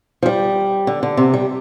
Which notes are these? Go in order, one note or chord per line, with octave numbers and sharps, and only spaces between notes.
F3
G3
D3
D3
C3
G3